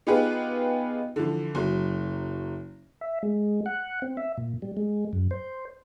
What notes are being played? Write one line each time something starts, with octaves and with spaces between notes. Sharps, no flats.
B3 D#4 F4 G4 G#4 B4
D3 E3 F3
F#1 F#3
E5
G#3
F#5
C4
E5
A#2
G3
G#3
F#2
C5